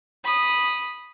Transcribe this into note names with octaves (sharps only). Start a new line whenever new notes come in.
B5 D#6